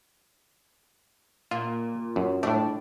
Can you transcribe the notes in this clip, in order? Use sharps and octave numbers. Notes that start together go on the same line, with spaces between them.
A#2 F4
F#2
A2 A3 D4